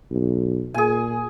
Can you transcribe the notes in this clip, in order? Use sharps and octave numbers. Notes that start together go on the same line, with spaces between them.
B1
A#2 G#4 G#5